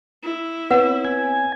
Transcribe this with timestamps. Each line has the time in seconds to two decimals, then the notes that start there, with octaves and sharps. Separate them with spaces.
0.24 E4
0.71 B3 C4 B4 C#5 F#5
1.05 G#5